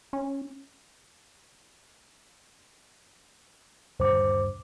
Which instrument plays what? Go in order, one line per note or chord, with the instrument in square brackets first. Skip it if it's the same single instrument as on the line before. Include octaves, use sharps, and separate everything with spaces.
[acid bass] C#4
[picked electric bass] D#1 G2 D3 [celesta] C5 D6